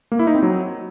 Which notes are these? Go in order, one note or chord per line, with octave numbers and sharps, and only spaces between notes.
A#3
E4
D#4
C4
F#3